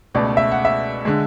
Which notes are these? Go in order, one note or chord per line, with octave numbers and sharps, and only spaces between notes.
C#2 B2 A3 D5
E5
F#5
E5
D3 G#3